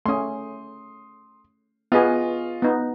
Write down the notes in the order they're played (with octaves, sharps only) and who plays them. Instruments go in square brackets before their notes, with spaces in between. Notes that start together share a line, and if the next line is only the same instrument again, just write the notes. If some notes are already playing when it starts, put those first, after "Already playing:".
[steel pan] A3 C#4 [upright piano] C6 D#6
[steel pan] B3 G#4 [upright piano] F4 D#5 C#6
[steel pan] B3 D#4